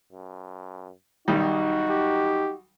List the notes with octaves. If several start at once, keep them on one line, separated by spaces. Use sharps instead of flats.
F#2
B1 D#3 G3 D#4 F#4
G4